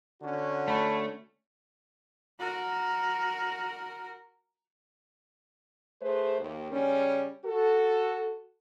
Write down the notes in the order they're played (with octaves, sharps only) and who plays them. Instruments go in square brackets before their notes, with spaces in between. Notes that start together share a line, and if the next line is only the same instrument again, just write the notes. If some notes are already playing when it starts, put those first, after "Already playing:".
[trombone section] D3 C#4 F#4
[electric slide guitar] A3 [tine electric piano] A5 B5
[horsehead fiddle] F#4 A#4
[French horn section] A3 G#4 B4 C5
D#2
C#3 G3 C#4
F#4 A4